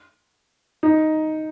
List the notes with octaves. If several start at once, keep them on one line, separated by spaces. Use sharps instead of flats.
D#4